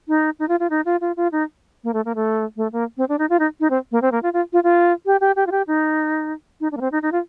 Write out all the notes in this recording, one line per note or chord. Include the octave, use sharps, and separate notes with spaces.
D#4
D#4
F4
F4
D#4
F4
F4
F4
D#4
A#3
A3
A#3
A3
A3
A#3
C4
D4
D#4
F4
D#4
D#4
C4
A#3
C4
A#3
F4
F4
F4
F4
G4
G4
G4
F4
G4
D#4
D#4
D4
A#3
C4
D#4
D#4
F4